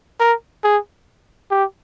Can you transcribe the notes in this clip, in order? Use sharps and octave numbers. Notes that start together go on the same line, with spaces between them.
A#4
G#4
G4